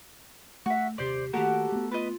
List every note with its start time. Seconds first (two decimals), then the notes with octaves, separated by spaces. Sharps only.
0.66 A3 F#4 E5
0.98 D#1 C3 G4 C5 D5
1.33 D#3 A3 A#3 F#4 G4 A4 A#4
1.72 A3 B3
1.91 F4 B4 D#5